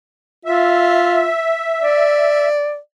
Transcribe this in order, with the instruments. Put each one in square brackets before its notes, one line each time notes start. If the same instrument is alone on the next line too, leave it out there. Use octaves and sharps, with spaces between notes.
[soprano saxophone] F4 [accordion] E5
[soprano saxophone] D5